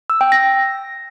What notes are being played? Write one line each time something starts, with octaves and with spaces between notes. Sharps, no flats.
E6
G5
A#6